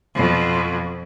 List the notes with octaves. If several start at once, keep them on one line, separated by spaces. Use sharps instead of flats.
F2 B2